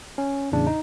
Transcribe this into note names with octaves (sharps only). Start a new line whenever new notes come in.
C#4
E2 A2 C#3 D4
D#4